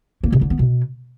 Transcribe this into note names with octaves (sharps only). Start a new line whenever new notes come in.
A#3
B2
D3
B3
B2